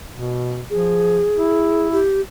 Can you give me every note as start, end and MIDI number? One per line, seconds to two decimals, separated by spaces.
0.15 0.63 47
0.70 1.23 53
0.70 1.88 68
1.37 2.01 64
1.92 2.21 67